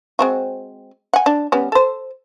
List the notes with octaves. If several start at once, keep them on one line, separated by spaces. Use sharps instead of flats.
G#3 C4 F#4
F#5 G#5
D4
G3 B3 C#4
A4 C5